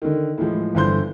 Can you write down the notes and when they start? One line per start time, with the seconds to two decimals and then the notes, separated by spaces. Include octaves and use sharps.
0.02 D3 D#3
0.38 A2 E3 F3 G#3
0.75 G1 D3 E3 C5 C6 G6